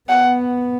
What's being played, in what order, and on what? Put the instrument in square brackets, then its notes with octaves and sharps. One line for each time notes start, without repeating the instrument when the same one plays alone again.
[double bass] B3 [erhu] F#5